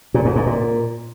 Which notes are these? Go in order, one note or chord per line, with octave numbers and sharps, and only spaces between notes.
A#2
G#2
G#2
A#2